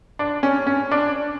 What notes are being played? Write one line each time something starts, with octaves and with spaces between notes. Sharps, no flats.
D4
C#4
C#4
D4